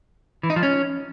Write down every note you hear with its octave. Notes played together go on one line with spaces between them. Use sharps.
E3
D#4
F3
C#4